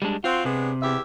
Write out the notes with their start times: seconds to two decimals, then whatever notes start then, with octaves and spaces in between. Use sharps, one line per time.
0.02 G3 G#3 D4
0.24 C4 F4 F#4
0.45 C3 G#3 B3 D4
0.81 E2 G4 E5